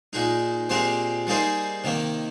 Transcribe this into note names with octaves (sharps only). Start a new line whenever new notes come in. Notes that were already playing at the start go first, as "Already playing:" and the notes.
A#2 G#3 D#4
A#2 G#3 C4 G4 C5
G3 A#3 D#4 G#4 C5
C3 D#3 A#3